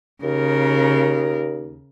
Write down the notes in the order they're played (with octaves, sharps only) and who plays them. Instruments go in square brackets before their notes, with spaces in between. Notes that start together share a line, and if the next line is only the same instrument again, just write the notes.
[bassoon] D#2 [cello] C#3 A#4